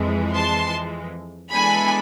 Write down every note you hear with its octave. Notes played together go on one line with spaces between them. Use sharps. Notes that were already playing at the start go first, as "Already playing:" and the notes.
Already playing: F2 E3 G#3
A5 C6
E3 G#3 B3 D4 A4 G#5 B5